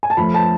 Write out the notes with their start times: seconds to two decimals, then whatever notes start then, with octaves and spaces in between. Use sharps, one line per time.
0.03 G#5
0.10 A5
0.17 F2 F3 A3 B5
0.34 A5